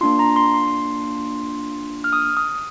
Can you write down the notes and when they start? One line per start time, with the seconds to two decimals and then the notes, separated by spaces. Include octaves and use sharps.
0.01 A#3 D4 F4 C6
0.19 A#5
0.36 C6
0.54 C6
2.04 F6
2.13 D#6
2.37 D#6